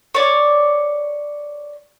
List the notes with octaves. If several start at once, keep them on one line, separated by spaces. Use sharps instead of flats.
C#5 D5